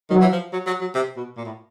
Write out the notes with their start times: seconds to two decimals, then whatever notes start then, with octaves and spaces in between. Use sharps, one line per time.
0.10 D#3 F#3
0.21 E3
0.32 F3
0.53 F#3
0.67 F#3
0.81 F#3
0.95 C3
1.16 B2
1.37 A#2
1.45 A2